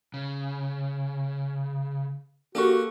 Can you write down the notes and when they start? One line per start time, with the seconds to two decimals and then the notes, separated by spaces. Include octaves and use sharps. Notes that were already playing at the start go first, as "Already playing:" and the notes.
0.14 C#3
2.55 A#3 D4 F#4 G4 A4 C#6